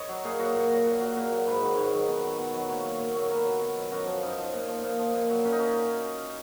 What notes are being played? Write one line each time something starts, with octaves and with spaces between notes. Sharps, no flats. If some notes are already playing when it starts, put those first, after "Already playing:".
Already playing: C#5 D#5
F#3
A#2 G#4
F#3 F#4
A#2
F#3
A#2
F#3
A#2 A#4
F#3
G#2 B4
D#3 F#3
G#2 C#5
D#3 F#3
B2
F#3
B2
F#3
A#2 C#5
F#3
A#2 C#5
F#3
B2 A#4
F#3
B2
F#3
F#2 F#4
F3
F#2 D#4
F3
A#2
F3
A#2
F3
A#2
F#3
A#2 C#4
D#4
F#3 C#4